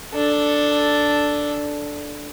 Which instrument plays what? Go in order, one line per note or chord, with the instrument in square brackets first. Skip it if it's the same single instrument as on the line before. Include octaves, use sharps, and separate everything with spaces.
[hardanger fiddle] D4 A4